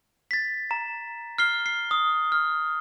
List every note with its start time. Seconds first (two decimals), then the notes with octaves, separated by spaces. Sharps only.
0.31 A6 B6
0.71 A#5
1.38 F6 C7 G7
1.66 C7
1.91 D#6
2.32 F6